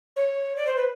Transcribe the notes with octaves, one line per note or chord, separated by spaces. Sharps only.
C#5
D5
C5
B4